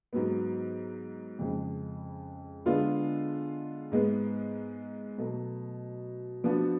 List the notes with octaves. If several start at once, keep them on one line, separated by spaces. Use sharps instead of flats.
G#2 F#3 B3
F2 C#3 G#3
D3 G#3 B3 F4
G#2 G#3 B3
B2 F#3 A3
F3 B3 D4 F#4